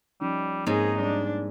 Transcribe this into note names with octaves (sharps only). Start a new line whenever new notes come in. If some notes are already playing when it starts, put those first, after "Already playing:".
F3 G3 C#4 D#4
G#2 A#3 C4 D#4 G#4 C#5
G3 D4